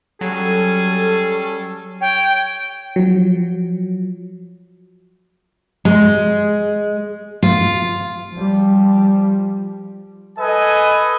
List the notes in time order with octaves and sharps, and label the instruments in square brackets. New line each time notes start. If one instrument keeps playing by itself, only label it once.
[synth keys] F#3 [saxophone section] G3 C#4 A4 [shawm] G#4
[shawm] C#5 [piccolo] G5
[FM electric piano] F3 F#3
[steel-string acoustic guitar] G#3
F4
[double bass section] F3 G3
[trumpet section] A4 B4 D#5 G#5